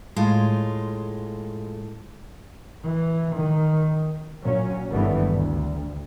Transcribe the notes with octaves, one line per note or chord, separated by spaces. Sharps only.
A2 G#3 F4
E3
D#3
A#2 F#3 C#4
G#1 G2 D#3 E3 A3 B3
D2